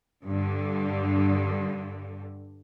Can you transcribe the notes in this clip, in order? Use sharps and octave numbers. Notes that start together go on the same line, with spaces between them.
G2 D3